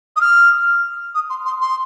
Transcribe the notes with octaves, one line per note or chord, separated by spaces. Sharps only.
D#6
F6
D#6
C6
C6
C6